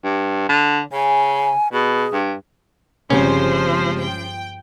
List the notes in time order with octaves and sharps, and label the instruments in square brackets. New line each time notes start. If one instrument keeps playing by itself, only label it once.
[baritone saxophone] G2
D3
[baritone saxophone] C#3 [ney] G#5
[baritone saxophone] B2 [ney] G#4
[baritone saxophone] G2
[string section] G1 G#3 C5 [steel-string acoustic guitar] C#3 C4 G4 [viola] F3 [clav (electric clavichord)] C#4
[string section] G5